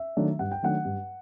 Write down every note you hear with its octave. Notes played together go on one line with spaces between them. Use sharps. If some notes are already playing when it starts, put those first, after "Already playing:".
Already playing: E5
D#3 F#3 A3 D4
G2 F#5
G5
D#3 F#3 A3 D4 F#5
G2